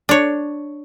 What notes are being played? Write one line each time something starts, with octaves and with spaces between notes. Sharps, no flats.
D4 C#5